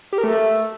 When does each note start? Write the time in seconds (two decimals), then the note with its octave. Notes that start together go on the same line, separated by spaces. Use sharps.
0.13 G4
0.18 A#4
0.24 A3